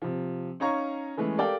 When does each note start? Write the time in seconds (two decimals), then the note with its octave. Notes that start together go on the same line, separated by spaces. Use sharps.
0.02 C3 F3
0.60 C#4 D#4 C#5 F5 A#5 C#6
1.17 E3 G#3 A3 B3 C#4
1.38 G4 A4 A#4 D5 F5 G5